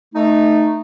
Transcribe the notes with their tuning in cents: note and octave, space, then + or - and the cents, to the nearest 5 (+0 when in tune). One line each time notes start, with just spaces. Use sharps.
A3 +0 D#4 -10